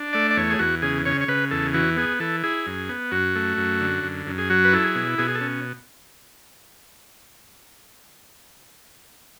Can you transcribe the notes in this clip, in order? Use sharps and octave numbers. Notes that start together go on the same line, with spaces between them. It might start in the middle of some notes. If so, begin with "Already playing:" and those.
Already playing: D4
A3 D5
D5
E2 C#5
G#4
E2 F#4
C#3 G#4
C#3 C#5
C#5
C#3 B4
E2 A4
E3 F#4
B3 G#4
E3 A4
E4 G#4
F#2
B3
F#2 F#4
A3
F#2
D3
F#2
F#2
G#4
F#3 F#4
B4
E4 A4
G#4
B2
B2 G#4
G#4
A4
C#4